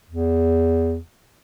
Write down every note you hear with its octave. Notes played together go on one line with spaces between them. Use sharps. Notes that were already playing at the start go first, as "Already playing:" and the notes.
E2